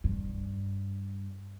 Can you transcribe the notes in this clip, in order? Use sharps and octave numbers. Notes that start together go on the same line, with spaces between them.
G2